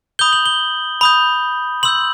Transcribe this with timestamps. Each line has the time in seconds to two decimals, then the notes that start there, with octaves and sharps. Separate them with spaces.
0.19 B5 D#6 G6 G7
0.33 F#7
0.46 G7
1.01 B5 D#6 G6
1.83 C6 E6 G6 F#7